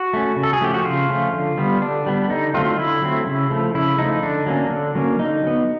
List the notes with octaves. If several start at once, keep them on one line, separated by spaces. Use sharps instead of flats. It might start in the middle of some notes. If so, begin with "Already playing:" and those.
Already playing: F#4
A3 C#4
C#3
A4
G#4
F3 A3 C#4 G4
F#4
C#3 F4
F3 A3 C#4
D3
G3 B3
D3 D4
G3 B3
D3 D#4
F#3 A3 C4 F4
D3 E4
F#3 A3 C4
C#3
F3 A3
C#3 E4
F3 A3 D#4
D3 D4
F#3 A#3 C#4
D3
F#3 A#3 C#4
D3 D#4
F#3 B3